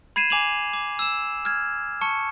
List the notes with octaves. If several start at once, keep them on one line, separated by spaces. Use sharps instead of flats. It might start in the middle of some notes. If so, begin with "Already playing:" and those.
B5 G#6 C7 D#7 E7
G#5 D6 F7 F#7
D6
E6 E7
F6 G#6
A5 C#6 C#7